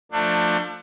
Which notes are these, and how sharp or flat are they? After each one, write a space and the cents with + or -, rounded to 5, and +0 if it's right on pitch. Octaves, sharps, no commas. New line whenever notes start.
F3 +20 A3 +35 D4 +25